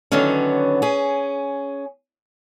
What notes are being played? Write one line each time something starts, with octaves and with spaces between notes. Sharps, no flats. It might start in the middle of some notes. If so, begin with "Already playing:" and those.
D3 D#3 F#3 B3 C#4
C#4 G#4